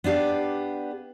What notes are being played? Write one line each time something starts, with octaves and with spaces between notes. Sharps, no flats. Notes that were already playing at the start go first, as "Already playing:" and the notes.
B3 D4 G4 F5